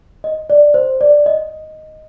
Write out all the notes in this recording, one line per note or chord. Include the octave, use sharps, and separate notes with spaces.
D#5
D5
C5
D5
D#5